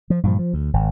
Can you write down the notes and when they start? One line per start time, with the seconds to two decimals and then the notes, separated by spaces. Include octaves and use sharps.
0.10 F3
0.23 G2 A#2 F3
0.39 F3
0.54 D2
0.73 G#1